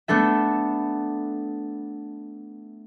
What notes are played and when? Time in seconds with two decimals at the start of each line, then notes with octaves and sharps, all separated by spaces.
0.08 A3 B3 D4 A4 E5